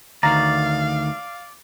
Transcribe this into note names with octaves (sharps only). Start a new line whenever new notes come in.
D2 D#3 D5 F5 A#5